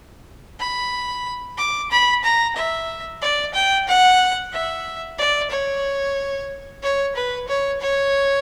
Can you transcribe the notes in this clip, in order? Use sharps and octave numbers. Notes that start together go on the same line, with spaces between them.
B5
D6
B5
A#5
E5
D5
G5
F#5
E5
D5
C#5
C#5
B4
C#5
C#5